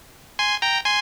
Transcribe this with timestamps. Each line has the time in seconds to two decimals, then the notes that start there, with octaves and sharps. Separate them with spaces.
0.39 G#5 C6
0.62 G5 A#5
0.85 G#5 C6